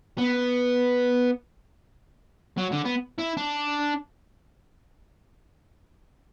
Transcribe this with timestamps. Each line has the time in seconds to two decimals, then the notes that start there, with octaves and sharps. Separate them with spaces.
0.18 B3
2.57 F#3
2.71 D3
2.85 B3
3.18 E4
3.37 D4